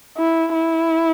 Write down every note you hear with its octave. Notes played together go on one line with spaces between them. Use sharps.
E4
E4